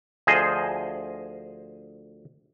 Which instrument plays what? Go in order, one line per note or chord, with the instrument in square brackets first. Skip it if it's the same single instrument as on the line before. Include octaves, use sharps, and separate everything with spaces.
[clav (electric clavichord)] D2 F3 G#4 C5 D#5 G#5